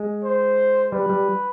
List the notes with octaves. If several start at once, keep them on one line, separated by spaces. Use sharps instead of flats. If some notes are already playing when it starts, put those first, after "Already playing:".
Already playing: G#3
C5
G3 B4
G3